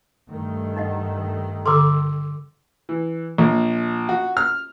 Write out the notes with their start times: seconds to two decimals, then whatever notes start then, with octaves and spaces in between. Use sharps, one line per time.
0.29 G2 D#3 A3
0.76 D#4 D#5 F#5
1.66 D3 A4 C6 D6 E6
2.89 E3
3.38 A#1
4.09 F#4
4.37 F6